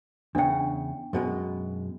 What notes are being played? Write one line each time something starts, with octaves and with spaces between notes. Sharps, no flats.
E2 C#3 D4 G5
F#2 B2 G#3